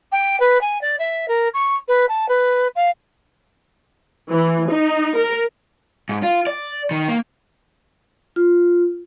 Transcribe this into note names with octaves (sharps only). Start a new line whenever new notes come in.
G5
B4
G#5
D5
E5
A#4
C#6
B4
A5
B4
F5
E3
D#4
A#4
G#2
F4
D5
D#3
A#3
F4